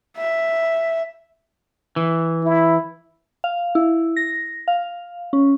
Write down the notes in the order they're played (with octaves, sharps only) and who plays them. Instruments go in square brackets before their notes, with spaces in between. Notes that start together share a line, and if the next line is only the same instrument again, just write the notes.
[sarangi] E5
[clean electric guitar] E3
[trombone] E4
[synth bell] F5
E4
A#6
F5
C#4